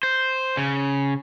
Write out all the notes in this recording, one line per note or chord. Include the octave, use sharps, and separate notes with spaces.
C5
C#3